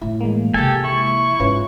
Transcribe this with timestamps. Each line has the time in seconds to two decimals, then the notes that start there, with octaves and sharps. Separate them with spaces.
0.01 A2 E4
0.21 E3 G#3 A#3
0.54 C3 F3 G4 A4 G#5
0.84 E4 C#6
1.40 G#2 C#4 F4 B4